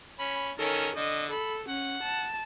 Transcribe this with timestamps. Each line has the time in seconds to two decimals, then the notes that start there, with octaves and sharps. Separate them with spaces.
0.20 C#4 B5
0.59 D#3 C#4 A4 A#4
0.96 D3 D#5
1.30 A4 B5
1.69 C#4 F#5
2.03 A5